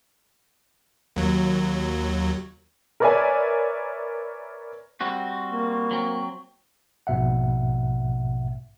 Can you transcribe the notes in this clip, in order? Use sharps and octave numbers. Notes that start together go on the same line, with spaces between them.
D#2 F#3
A#4 B4 C#5 D5 E5 G#5
G3 C4 F#4 C#6
A#3
F#3 C4
A#1 G#2 B2 E5 F#5